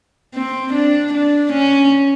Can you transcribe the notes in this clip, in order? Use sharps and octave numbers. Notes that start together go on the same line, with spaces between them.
C4
D4
D4
C#4